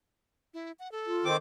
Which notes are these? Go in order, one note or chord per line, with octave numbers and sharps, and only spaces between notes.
E4
F#5
A4
F4
D#3 C4 D6